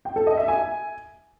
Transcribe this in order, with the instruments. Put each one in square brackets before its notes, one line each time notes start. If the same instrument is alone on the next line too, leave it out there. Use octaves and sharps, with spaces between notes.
[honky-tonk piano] G5
A4
D#5
E5
G#5